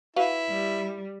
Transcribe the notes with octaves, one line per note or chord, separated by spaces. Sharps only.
E4 F#4 B4 F5
G3